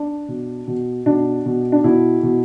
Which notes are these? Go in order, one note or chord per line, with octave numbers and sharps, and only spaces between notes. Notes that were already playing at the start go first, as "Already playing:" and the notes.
Already playing: D4
B2
B2
B2 D4
B2
D4
B2 E4
B2